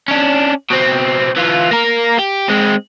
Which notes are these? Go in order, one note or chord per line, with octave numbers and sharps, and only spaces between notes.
C#4 D4
B2 C4
E3 F4
A#3 A#4
G4
G#3 C4